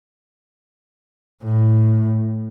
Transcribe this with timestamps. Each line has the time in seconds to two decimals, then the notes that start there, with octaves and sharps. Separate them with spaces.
1.44 A2